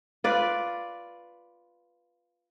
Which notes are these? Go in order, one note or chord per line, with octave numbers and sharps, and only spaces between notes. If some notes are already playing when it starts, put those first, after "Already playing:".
F4 B4 D5